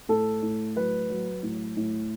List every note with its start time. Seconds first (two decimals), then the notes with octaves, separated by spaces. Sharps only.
0.09 A2 A4
0.42 A2
0.76 F#3 B4
1.10 F#3
1.43 A2
1.77 A2